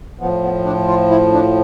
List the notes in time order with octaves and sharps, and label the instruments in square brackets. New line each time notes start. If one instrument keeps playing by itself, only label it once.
[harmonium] A2 F3 B3
B3
D4
F4
E4
D4